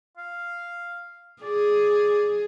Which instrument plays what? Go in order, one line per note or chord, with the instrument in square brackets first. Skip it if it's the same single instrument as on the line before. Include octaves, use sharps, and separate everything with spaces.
[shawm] F5
[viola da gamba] G#4 [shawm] D5